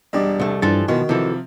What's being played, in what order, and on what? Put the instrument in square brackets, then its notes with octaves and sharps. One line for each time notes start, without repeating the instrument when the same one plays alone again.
[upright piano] E1 D4 D6 [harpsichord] G3 D#5
[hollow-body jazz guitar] C2 A3
[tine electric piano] G2 A6 [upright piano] E3 [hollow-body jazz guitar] F3 D4 A4
[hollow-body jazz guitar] B2 F3 [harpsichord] D#3 [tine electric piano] F#4
[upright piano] C3 F3 [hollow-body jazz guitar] E3 A4